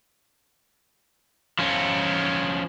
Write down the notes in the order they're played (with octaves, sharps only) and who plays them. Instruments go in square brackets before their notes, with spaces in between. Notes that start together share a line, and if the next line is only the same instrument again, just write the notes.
[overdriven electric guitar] F3 C#4